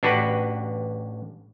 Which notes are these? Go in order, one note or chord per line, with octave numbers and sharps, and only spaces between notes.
A1 D4 F#4 G4 B4